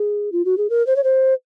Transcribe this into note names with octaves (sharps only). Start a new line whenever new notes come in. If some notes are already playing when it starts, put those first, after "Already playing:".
Already playing: G#4
F4
F#4
G#4
A#4
C5
C#5
C5